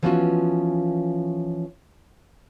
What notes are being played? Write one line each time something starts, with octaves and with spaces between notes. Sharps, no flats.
E3 F3 B3 C#4 F4 F#4